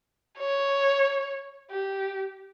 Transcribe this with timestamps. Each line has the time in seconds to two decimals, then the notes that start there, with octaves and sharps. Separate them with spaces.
0.39 C#5
1.71 G4